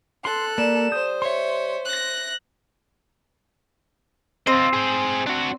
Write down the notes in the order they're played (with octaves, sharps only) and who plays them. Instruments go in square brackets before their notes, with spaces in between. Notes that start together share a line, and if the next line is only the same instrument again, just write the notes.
[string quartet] A4 F#6 [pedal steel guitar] C6
[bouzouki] G3 [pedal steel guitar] A#3 [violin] E7
[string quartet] C5 [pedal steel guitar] D#6 G6
[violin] C#5 [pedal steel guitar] E5 C6
[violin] F#6 A#6
[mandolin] C4 [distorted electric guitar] F4 D#5
[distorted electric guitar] G#4 C5
D4 F#4